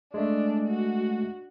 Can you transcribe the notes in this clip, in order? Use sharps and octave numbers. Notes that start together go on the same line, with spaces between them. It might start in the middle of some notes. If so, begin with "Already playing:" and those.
G#3 A3 D4
F#4